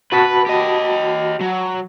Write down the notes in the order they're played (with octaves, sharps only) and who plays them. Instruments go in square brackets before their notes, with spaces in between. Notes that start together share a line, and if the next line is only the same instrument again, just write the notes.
[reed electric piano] F#4 A5 B5 [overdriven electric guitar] B4
[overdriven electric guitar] G4 D#5
F#3